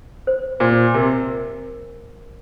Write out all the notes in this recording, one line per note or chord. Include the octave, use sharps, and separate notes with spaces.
C5
A#2 C5
C3 A#4